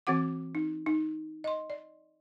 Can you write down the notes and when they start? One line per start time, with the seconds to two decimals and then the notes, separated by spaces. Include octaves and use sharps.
0.07 E3 C4 F#4 F#5 D6
0.55 D#4
0.86 D#4
1.44 D#5 C6
1.70 D5